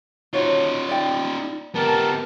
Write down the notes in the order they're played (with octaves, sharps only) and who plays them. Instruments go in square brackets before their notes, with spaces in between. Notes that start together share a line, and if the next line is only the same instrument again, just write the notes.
[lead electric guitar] D#4 F4 [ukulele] F#4 C5 C#5
[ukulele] D5 G5
[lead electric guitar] B3 G4 [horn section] A#4 A5